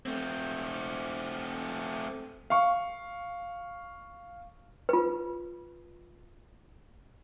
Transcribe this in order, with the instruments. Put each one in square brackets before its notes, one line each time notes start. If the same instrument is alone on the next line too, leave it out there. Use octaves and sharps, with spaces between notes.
[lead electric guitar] A3 C4
[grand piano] F5 C#6
[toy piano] F4 B4